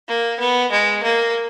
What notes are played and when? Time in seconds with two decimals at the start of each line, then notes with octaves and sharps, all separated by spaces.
0.08 A#3
0.39 B3
0.72 G#3
1.03 A#3